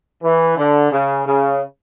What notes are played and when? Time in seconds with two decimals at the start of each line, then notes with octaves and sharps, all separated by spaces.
0.23 E3
0.57 D3
0.91 C#3
1.25 C#3